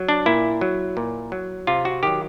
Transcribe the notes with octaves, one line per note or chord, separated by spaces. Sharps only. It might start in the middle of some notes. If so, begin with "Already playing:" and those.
Already playing: F#3
D4
A#2 E4
F#3
A#2
F#3
C3 F4
F#4
D#3 F#3 G4